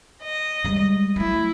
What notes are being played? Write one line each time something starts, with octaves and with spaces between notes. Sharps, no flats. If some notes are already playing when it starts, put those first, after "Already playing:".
D#5
G3 G#3
F#3 A3 E4